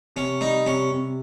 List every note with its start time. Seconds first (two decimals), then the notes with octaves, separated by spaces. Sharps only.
0.16 C3 C#4
0.41 G3 D#4
0.66 C3 C#4
0.91 C3